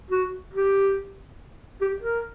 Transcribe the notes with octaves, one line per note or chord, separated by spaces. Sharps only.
F#4
G4
G4
A#4